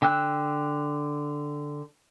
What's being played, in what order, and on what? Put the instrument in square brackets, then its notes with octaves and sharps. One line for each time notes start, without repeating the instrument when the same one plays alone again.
[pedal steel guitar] D3 G5 E6 F#6